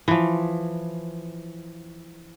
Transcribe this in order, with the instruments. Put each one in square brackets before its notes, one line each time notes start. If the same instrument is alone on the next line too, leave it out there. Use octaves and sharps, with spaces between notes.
[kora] E3 F3